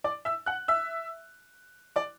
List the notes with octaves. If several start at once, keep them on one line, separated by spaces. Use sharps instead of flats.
D5 D6
E5 E6
F#5 F#6
E5 E6
D5 D6